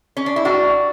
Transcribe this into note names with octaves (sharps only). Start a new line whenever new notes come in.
C#4
D4
E4
A2 G3 D4 F#4